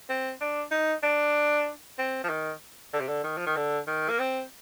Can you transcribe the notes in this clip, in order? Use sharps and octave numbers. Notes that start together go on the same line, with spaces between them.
C4
D4
D#4
D4
C4
F3
D#3
D3
C3
D3
D#3
F3
D#3
D3
D#3
A#3
C4